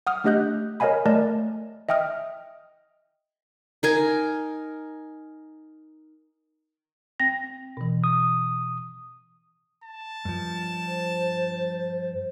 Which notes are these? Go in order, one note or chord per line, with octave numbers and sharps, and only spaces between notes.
F#5 D#6 F6
A3 D4 G4 D#5 F#6 G6
A#4 C#5 D#5 F5 G#5 B5
A3 A#4 D5 D#5 A5
D#5 E5 G5 D#6 F6
D#4 A#4 G#5
C4 G5 A#6
B2 E3
D#6
A5
G2 F3
C5